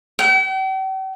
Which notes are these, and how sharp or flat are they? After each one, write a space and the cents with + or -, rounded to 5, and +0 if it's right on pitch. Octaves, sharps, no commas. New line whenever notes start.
G5 -45